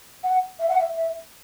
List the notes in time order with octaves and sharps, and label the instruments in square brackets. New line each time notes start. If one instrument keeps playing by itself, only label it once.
[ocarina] F#5
E5
F#5
E5
E5